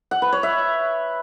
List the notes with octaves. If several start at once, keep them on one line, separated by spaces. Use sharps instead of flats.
F#5
B4
C#5
E5